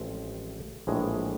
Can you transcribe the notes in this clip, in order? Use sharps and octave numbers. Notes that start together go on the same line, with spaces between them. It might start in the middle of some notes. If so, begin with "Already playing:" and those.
Already playing: A1 A2 F3 G#3 C4
A#1 A2 E3 G#3